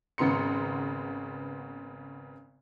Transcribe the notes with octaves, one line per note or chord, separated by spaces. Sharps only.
G#1 C#3 B3 A#5 C6 C#7